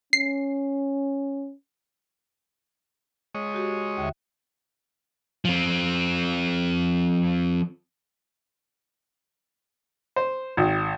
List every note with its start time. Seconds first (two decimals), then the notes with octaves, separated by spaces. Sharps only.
0.13 C#4 C7
3.35 G#3 C#5 D#5
3.54 F#4 G4
3.98 D#2 D3 E5
5.45 F3 C4
10.16 C5
10.57 G#1